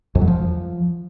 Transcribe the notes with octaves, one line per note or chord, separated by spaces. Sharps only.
F2
F#3
F3